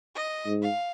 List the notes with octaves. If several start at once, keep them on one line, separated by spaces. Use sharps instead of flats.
D#5
G#2
F5